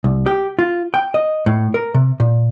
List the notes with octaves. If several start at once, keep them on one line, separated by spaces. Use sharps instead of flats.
C2
G4
F4
G5
D#5
A2
A#4
C3
A#2